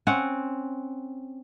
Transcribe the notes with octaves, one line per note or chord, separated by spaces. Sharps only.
C4 C#4 F#5